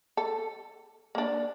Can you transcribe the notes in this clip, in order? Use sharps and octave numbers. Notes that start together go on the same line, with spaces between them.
A4
A#3 D4